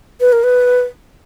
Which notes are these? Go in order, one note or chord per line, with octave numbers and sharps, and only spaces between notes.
B4
A#4
B4